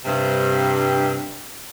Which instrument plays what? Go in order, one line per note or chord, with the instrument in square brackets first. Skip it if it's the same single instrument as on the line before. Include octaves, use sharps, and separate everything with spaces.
[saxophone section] G2 C3